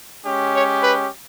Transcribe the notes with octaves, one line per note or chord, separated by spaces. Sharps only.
G#3 C#4 G4
C#5
B4